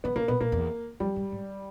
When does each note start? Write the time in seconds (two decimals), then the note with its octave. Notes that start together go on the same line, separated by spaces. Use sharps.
0.04 D3 B3
0.16 C#3 A#3
0.28 B2 B3
0.41 A#2 A#3
0.52 E2
1.00 F2 G3
1.16 G2
1.32 G#2